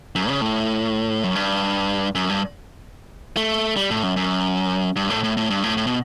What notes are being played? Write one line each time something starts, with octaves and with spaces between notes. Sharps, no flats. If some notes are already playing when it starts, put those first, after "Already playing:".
F#2
C#3
A2
F#2
G2
F#2
G2
A3
G3
A2
F#2
F#2
G2
A2
A2
A2
G2
A2
A2
B2